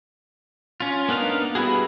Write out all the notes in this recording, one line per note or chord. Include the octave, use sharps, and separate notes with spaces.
C#4 F4
A#3 B3 D4 D#4 F5
G3 B3 E4 F#4 G#4